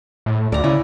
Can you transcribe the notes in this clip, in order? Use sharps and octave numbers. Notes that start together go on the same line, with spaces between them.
A2
D2 D5 A#5
C#3 C#4 E4